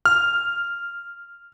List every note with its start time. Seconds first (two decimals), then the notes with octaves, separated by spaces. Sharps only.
0.05 F6